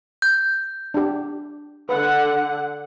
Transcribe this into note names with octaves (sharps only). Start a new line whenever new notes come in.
G6
D4 G4
D3 B4 F#5